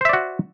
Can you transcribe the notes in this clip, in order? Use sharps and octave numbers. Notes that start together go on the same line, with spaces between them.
F#4 C5 D5 E5